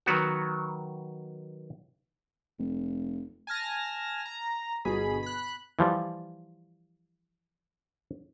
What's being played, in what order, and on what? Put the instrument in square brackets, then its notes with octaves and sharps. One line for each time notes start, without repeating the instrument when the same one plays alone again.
[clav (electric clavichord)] D#3 F#3 B3 F#4
[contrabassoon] F1
[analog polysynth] G#5 A5 F6 A#6
A#5
G1 B2 G#4 B5
B5 F#6
[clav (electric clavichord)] E3 F3 G3